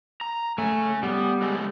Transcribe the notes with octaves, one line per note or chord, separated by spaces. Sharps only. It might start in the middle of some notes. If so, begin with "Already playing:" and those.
A#5
C#3 A3 G#5
G3 B3
C#3 G#3 A3